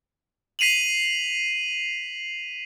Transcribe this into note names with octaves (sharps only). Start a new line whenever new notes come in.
B6 C7 D#7 F7 F#7